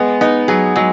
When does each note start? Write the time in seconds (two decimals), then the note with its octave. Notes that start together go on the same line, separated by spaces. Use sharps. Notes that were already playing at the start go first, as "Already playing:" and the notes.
Already playing: G#3 B3
0.21 B3 D#4
0.48 F#3 G#4
0.76 F#3 G#3